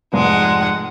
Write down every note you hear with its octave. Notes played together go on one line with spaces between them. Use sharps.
F1 G#2 G#3 F#5